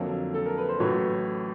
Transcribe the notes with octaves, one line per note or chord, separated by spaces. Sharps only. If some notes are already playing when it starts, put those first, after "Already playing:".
Already playing: F2 D3 F#3 A#3 A#4
A4
A#4
B4
C5
A1 A2 F#3 B4 C#5